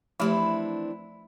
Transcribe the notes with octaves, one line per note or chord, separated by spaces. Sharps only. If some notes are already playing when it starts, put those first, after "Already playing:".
E3 F3 A3 C4 D4 E4 G4